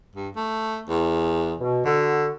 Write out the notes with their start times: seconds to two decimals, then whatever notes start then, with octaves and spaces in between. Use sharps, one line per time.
0.16 G2
0.36 A3
0.89 E2
1.59 B2
1.85 D3 F#4 A4